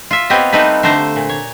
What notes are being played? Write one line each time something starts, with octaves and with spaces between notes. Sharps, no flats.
F4 E5
B3 C4 G4 C#5 D#5
G3 A3 C4 D#4 A4 B4
D3 A3 C5 A#5
A#2
C#5